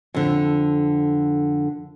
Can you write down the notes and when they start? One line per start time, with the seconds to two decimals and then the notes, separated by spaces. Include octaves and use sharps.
0.14 F2 D3